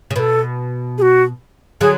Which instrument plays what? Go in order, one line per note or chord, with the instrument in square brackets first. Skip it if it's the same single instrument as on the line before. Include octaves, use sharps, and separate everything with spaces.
[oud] C#3
[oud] B2 [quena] A4 B4
[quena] G#4
F#4
[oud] D3 F#3 [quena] G#4